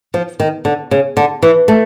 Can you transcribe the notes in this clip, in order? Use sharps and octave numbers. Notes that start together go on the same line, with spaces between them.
F3
D#3
D3
C#3
D3
E3
A3